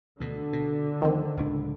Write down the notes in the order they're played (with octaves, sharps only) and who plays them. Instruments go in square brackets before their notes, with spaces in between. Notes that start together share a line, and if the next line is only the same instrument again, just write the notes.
[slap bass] D2 B2 [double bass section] D3
[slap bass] B2
[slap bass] D2 F3 [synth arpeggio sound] D#3 C4
[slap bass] D1 C#2 D4